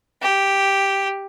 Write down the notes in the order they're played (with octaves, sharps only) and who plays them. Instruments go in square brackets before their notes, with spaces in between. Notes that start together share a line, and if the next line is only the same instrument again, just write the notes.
[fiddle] G4